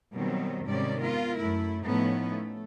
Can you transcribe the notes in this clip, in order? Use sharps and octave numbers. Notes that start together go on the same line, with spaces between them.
B2 D#3 F#3 G3 C4
G#2 C3 D#3 G3 C#4 D5
B3 F4 A#4
F#2 A3 E4
A2 F3 A3 B3 C#4 D#4
A3